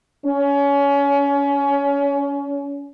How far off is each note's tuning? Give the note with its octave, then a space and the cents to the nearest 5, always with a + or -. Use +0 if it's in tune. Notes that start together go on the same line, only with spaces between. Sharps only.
C#4 +25